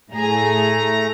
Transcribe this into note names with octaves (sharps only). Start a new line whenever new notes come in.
A2 A3 G#4 A#5